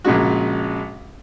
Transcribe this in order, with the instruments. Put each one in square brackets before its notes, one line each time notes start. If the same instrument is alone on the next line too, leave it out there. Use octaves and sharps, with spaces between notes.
[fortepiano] A#1 A#2 C#3 G#3 F#4